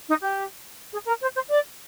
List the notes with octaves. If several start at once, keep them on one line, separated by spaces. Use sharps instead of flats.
D#4
G4
G#4
A#4
C5
C5
D5